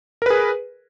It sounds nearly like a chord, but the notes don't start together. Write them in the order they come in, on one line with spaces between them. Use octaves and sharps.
A#4 B4 G#4